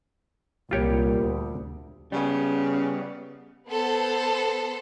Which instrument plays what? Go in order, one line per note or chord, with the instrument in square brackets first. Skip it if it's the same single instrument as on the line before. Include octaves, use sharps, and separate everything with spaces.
[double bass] C2 G3 [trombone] A#2 [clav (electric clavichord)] F4 G4 C#5
[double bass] D2
[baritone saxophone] C#3 [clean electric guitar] G3 B3
[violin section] B3 A4 C5